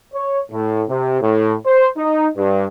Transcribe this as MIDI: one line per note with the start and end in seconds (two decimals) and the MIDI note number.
0.13 0.39 73
0.52 0.82 45
0.88 1.20 48
1.21 1.54 45
1.66 1.88 72
1.96 2.28 63
2.37 2.65 43